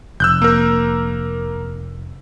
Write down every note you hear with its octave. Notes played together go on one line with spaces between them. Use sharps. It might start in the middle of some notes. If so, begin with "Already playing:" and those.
F1 E6 F#6 G6
A#3 A#4